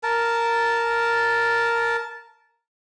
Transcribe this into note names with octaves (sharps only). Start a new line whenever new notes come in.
A#4 A5